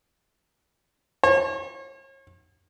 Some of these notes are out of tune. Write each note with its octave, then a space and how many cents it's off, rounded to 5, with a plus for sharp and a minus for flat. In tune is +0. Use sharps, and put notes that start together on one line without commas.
C#5 -40